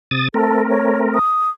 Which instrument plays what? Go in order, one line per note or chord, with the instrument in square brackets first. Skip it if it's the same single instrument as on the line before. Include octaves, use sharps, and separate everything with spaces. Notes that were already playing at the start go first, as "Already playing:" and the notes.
[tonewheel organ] C3 D#6 A6
[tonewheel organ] A3 C4 A#4 [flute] A4
[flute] C#5
D#6